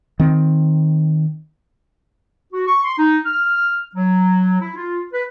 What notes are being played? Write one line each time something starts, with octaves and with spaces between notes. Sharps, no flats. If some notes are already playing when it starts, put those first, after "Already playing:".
D#3 C4
F#4
C#6
C6
D#4
F6
F#3
E4
F4
B4